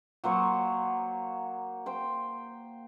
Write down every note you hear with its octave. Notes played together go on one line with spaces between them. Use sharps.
F#3 A#3 C5 C#5
C5 G5